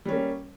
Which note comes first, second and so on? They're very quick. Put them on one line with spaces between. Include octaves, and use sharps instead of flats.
G3 C#4 A#3